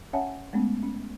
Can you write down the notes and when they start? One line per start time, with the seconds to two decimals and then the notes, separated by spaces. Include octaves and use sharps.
0.13 C#4 C#5 E5 F#5 G#5 A5
0.53 G#3 A3 B3 C#4
0.83 C#4